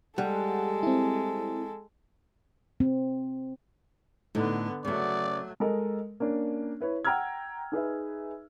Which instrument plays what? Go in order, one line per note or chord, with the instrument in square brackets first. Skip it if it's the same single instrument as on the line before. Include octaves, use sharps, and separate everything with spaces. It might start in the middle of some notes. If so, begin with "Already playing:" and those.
[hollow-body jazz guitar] G3 [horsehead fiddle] G#3 A4 [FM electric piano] F#5
[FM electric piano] C4 E4
[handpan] C4
[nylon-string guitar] A2 D#4 [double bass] D3 B3
[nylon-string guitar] C#3 B3 [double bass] F#3 A3 [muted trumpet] D5
[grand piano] G#3 A4 A#4 D#5
A#3 C#4 D4
E4 B4 C#5
F#5 G5 A#5 E6 F6 G#6
D#4 G#4 B4 E5